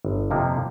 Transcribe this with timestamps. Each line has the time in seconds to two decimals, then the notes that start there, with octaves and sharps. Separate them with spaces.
0.05 G1
0.31 F2 C3 F3 A#3